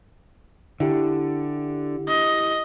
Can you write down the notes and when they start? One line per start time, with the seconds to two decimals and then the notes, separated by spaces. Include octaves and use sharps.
0.80 D3 E4 G4
2.08 D#5